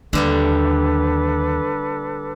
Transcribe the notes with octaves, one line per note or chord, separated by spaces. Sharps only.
D#2 D3 G3 A#3 A4 B4 D6